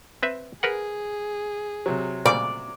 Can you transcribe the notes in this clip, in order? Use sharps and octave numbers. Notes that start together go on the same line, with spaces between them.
C4 B4 E5
G#4 A#4 B4 F#5
C3 F#3
A#2 C#3 G3 D5